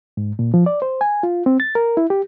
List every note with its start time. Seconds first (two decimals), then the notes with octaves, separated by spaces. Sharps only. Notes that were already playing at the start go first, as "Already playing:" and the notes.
0.17 G#2
0.39 A#2
0.54 F3
0.66 D5
0.82 C5
1.01 G#5
1.23 F4
1.46 C4
1.60 A6
1.75 A#4
1.97 E4
2.10 G4